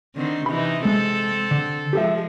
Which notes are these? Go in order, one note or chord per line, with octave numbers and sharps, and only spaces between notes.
D3 D#3 C4
C3 E3 D#4 B5
G#3 C4 A4
D3
F3 G#3 G4 A4 E5